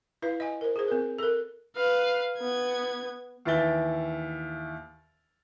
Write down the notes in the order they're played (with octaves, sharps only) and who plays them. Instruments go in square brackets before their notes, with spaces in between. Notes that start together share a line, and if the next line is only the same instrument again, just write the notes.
[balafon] E4 B4 F5
D#5 G#5
A#4 C5
G#4 C5
C4 A#4
A4 A#4
[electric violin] B4 F5
B3 G#6
[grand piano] D#2 E3 E5 A6 G7